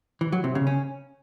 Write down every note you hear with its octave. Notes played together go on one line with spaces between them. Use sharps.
E3
F#3
C3
C#3
C#4